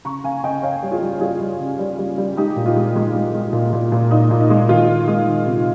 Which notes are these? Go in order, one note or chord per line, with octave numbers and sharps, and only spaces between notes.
C#3 A#5 C#6
C#3 F5 G#5
C#3 D#5 G5
C#3 C#5 F5
G3
F4 G#4
G3
G3 F4 G#4
G3
C#3
G3
G3
G3
G#3 D#4 G4
A#2
F4
G#3
G#3
G#3
G#3
A#2
A#2
A#2
A#2 D#4
A#2
D#4
G#3
D#3 F4
D#3
G#3
D#3
C3